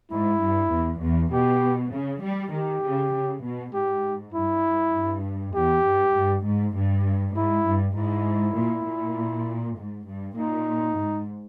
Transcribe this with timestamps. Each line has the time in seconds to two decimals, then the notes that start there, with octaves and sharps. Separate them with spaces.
0.11 G#2 E4
0.42 G2
0.72 E2
1.02 E2
1.33 B2 G4
1.93 C#3
2.23 G3
2.53 D#3 G4
2.84 C#3
3.13 C#3
3.43 B2
3.73 G#2 G4
4.34 G2 E4
4.94 G2
5.55 E2 G4
5.85 G2
6.16 G2
6.45 G#2
6.76 G2
7.36 G#2 E4
7.66 G2
7.96 G#2 E4
8.57 A#2
8.87 A#2
9.78 G#2
10.07 G2
10.37 A#2 D#4
10.97 G#2